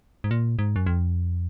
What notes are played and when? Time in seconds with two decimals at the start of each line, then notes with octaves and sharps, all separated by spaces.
0.24 G#2
0.31 A#2
0.59 G#2
0.76 F#2
0.86 F2